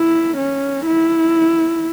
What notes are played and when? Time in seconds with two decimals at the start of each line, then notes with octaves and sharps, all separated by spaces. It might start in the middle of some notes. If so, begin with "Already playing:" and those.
Already playing: E4
0.37 C#4
0.87 E4